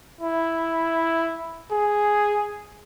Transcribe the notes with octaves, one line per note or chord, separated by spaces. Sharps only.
E4
G#4